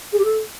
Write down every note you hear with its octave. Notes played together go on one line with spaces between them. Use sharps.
G#4
G4
A4